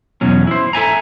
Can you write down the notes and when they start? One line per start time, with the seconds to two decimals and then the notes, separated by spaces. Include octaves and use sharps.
0.21 E2 B2 F#3 C#4
0.47 E4 C5
0.73 A4 E5 G#5 A#5